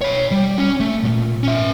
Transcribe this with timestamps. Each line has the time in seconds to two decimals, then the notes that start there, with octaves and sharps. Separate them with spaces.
0.01 C#5 B5
0.31 G3
0.58 C#4
0.80 A3
1.03 B1 A#2
1.43 C#4 E5